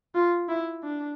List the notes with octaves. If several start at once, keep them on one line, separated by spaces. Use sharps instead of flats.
F4
E4
D4